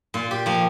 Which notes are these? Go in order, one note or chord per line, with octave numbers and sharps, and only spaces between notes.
A#2 F4
G4
F3 A#3